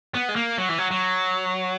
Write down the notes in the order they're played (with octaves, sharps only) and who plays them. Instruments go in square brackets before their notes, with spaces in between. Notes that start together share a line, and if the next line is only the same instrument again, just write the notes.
[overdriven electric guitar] B3
G#3
A#3
F#3
E3
F#3
F#3